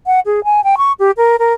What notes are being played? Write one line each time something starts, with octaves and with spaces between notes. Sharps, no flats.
F#5
G#4
G#5
G5
C#6
G4
A#4
A#4